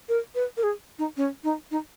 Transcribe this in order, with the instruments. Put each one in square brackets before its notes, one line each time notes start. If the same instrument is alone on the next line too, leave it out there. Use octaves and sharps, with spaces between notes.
[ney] A#4
B4
A#4
G#4
D#4
C#4
D#4
D#4